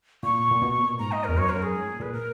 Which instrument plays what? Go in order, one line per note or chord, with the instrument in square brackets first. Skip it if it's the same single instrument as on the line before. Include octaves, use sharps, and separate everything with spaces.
[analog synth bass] A#2 [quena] C#6
[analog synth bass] A#2
B2
A#2
[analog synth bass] G#2 [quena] A#5
[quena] D#5
[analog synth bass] E2 [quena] A#4
[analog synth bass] F#2 [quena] C#5
[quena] A#4
[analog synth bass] F#2
[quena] G#4
[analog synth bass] G#2
A#2
[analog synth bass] A#2 [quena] B4
[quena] A#4